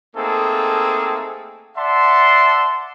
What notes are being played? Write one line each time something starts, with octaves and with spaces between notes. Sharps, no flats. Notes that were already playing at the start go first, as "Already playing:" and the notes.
A3 A#3 C4 D#4 G#4 A4
D5 E5 F#5 A5 C6